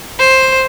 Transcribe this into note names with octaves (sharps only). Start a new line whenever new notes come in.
C5